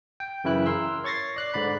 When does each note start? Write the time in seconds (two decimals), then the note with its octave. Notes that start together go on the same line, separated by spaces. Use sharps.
0.20 G5
0.44 F#2 C#3 E3 E4 F#6
0.66 A#4 C6 E6
1.04 C#5 C#6 A6 A#6 C7
1.36 D5 F#6 C7
1.54 G#2 D3 D5 B5